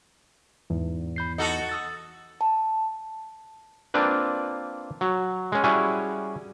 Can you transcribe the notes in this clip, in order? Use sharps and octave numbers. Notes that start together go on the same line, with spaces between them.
E2 G#2
B5 G6 C7
D#4 F#4 A4 D#5
D#6 E6 A6
A5
A#3 C4 D4 F4 B4
F#3
G#3 C#4
G3 C#4 E4 F#4 G#4